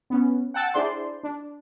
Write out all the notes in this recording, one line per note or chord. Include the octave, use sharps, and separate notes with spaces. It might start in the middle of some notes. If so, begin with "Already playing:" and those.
B3 C#4
F#5 G5 A5 E6 A6
D4 E4 G#4 C5 D5 C6
D4